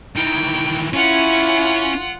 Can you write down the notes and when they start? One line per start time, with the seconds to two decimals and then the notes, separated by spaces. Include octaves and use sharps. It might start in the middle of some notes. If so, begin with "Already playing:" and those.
0.16 D#3 E3 G5
0.93 C#4 E4 F4 F#5